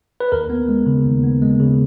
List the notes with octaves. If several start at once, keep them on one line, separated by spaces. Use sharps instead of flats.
B4
D#2 A#4
B3
G#3
C#3
D#2
B3
G#3
C#3